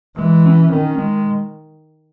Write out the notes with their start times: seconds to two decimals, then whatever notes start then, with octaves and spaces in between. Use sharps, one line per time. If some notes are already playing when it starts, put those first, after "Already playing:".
0.18 E3 G#3
0.46 C#4
0.72 D#3 C#4
0.98 G#3